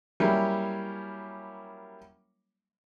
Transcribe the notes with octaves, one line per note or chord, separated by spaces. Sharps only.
F#3 G3 A#3 C#4 E4 C#5